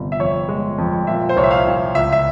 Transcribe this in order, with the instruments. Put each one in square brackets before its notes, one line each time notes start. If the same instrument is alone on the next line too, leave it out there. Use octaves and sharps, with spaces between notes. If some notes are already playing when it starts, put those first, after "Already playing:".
Already playing: [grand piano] G1 C3
E5
F2 C#5
G#3
F2
A#2 E5
C5
C2 C#5
E5
F5
C2
C#2 E5
E5